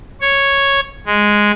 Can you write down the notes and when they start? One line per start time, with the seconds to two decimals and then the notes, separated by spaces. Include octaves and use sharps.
0.21 C#5
1.06 G#3